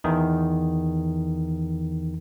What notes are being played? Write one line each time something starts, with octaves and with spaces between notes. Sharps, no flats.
E2 D#3